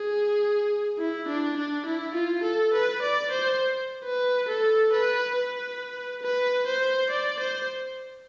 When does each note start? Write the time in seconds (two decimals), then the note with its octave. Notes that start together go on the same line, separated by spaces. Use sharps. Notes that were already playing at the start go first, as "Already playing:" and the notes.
Already playing: G#4
0.99 E4
1.28 D4
1.57 D4
1.86 E4
2.15 F4
2.43 A4
2.73 B4
3.02 D5
3.31 C5
4.04 B4
4.48 A4
4.92 B4
5.35 B4
6.23 B4
6.66 C5
7.10 D5
7.40 C5